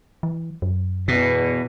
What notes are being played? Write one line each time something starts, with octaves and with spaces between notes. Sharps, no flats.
E3
F#2
E2 B2 E3